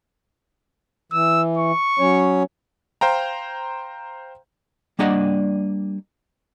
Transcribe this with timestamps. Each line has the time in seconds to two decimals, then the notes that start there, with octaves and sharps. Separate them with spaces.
1.12 E3 E6
1.57 C#6
1.99 F#3 C#4 C#5
3.01 C5 F5 G5 A#5
4.99 G3 A#3 D4 D#5 F#5